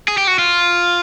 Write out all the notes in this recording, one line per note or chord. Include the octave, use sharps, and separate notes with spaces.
G#4
G4
F#4
F4